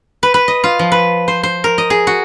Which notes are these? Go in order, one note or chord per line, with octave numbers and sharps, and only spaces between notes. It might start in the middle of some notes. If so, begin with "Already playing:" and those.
B4
B4
D#5
F4
F3
B4
C5
C5
A#4
D#5
G#4
F#4